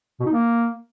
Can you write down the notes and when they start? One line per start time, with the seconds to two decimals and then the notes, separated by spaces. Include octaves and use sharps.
0.20 B2
0.26 D#4
0.32 A#3